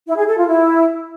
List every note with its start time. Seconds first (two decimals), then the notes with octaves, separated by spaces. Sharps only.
0.07 E4
0.17 G#4
0.27 A4
0.37 F4
0.47 E4